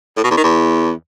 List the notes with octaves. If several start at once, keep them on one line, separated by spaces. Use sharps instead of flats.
A2
B2
E2
D#3
E2